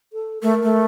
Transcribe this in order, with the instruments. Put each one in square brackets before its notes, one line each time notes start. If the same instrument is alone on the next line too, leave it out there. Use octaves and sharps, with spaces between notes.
[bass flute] A4
[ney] A3 [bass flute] A#4
[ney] A3